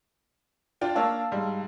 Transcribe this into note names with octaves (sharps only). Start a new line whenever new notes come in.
D4 F4 G5
A#3 D4 C#5 F5 A5 E6
G#2 G3